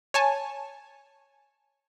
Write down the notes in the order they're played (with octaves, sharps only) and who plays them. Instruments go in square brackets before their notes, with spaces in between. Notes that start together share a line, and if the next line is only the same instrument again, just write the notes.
[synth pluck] C#5 G#5 A5